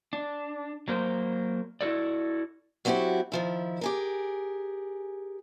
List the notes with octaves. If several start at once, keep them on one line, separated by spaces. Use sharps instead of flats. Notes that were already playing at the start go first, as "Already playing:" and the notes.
D4
F#3 A#3 C5
E4 F#4 A4 D5
F#3 G3 C4 E4 F#4 G4
D#3 F3 E4
G4 G#4 A#4